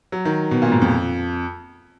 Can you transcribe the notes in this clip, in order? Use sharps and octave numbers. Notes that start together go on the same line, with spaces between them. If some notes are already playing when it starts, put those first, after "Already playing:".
F#3
D#3
B2
A#2
G#2
F2